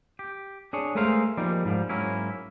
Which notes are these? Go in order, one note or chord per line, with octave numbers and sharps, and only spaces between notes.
G4
D4 G#4 C#5
G#3 A3 G#4 A#4 C5 F5
F3 G3 G#3 A#3 D#4
G#2 F3 G3
G#2 F#3 A#3 C#4 E4